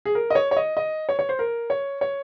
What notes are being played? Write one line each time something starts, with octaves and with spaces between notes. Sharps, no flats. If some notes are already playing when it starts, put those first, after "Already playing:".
G#4
A#4
D#5
C#5
C#5
D#5
D#5
C#5
C#5
C5
A#4
C#5
C#5